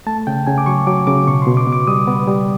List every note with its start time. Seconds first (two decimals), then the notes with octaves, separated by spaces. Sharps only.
0.07 A3 A5
0.27 C#3 G5
0.47 C#3 G#5
0.58 D6
0.66 F#3 C#6
0.87 F#3 D6
1.07 C#3 D6
1.27 B2 C#6
1.42 C6
1.47 B2
1.57 D6
1.67 B3
1.72 D6
1.87 G3 D#6
2.07 B3
2.27 G3